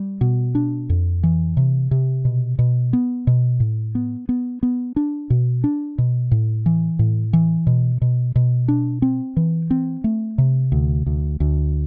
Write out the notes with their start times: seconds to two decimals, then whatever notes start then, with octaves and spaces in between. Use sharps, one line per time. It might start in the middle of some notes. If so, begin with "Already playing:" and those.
Already playing: G3
0.21 B2
0.55 D4
0.90 F2
1.23 E3
1.57 C3
1.91 C3
2.25 B2
2.59 B2
2.93 B3
3.27 B2
3.60 A2
3.95 B3
4.29 B3
4.63 B3
4.96 D4
5.30 B2
5.64 D4
5.98 B2
6.31 A2
6.66 E3
6.99 A2
7.33 E3
7.67 B2
8.02 B2
8.36 B2
8.68 D4
9.02 C4
9.37 E3
9.71 C4
10.04 A3
10.38 C3
10.72 D2
11.06 D2
11.40 D2